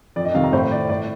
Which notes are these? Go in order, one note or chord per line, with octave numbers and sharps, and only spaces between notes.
F2 D5
D#5
C3 D#3 F5
A#5
A2 C5
D5
A2 D5